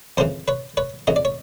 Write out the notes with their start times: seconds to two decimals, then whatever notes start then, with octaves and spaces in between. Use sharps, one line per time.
0.17 F2 C#3 E3 A#4 C5
0.48 B4 C#5
0.77 B4 C#5
1.07 F2 C#3 E3 D#5
1.16 D5
1.25 C#5